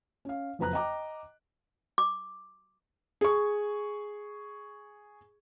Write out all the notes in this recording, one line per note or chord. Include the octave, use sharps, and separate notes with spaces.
C#4 F5
F#1 F2 B4 A#5 F#6
D#5 G5 A#5 D6
D6
G#4 C#6